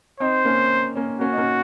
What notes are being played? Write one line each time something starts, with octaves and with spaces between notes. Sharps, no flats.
C4 D#4 C5
A#3 C#4
A#3 C#4
A#3 C#4 F#4
D#4
A#3 C#4